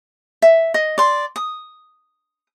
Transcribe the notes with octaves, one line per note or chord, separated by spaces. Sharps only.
E5
D#5
D5 C6
D#6